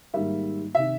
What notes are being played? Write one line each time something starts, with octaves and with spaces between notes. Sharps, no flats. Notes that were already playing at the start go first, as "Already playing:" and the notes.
G#2 D#3 G3 A#3 E5
C3 D#3 E5